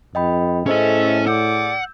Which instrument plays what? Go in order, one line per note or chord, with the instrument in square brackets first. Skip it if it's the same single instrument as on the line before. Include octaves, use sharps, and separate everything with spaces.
[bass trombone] F2 [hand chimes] D#5 G5 B5
[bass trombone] A2 [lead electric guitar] C#4 G#5 [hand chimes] G#4 C5 D#5 [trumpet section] A4 E5
[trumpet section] G#4 D5 D6 [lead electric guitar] F#5 [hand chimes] E6 G6